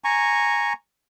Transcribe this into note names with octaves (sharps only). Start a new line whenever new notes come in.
G#5 A#5 C#6